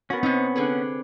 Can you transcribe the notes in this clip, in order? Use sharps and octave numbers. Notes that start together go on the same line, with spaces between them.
B3 C#4 F#4 A#4
C3 C4 D#4
D3 G#4 B4